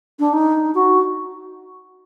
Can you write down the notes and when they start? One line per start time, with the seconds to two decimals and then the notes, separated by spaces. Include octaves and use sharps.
0.19 D4
0.33 D#4
0.75 F#4